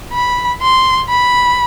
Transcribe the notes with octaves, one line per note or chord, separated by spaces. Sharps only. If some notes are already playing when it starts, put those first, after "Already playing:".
B5
C6
B5